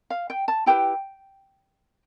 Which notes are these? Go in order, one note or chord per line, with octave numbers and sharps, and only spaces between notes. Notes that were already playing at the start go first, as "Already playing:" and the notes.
F5
G5
A5
E4 G4 B4 G5